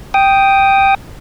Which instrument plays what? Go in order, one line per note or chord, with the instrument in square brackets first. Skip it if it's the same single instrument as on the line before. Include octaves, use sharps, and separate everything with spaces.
[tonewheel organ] G5 D#6